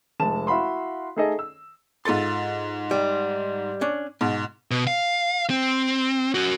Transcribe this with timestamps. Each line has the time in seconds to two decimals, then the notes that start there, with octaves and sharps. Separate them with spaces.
0.20 F1 G#3 A5 E7
0.47 E4 F#4 F5 B5 C6
1.16 A3 D#4 G#4 A4 D#5
1.39 E6
2.05 G#2 F4 A4 C6 A6
2.91 G3
3.81 C#4 D4
4.21 G#2 B2
4.71 B2
4.87 F5
5.50 C4
6.34 C#4 F#4